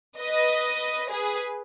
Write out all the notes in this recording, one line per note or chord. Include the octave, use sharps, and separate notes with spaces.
B4 D#5
G#4 B4